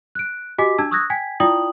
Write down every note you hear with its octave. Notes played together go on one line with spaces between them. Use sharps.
F#6 D7
F#4 G4 D#5 G#5 D6 B6
D4 A5 E6 G#6
C#6 D#6 E6 F#6 G#6 A#6
G5 G#5 G#6 B6
E4 F4 D5 G5 D#6 F#7